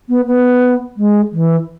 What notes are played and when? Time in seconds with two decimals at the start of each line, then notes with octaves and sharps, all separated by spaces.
0.09 B3
0.27 B3
0.97 G#3
1.32 E3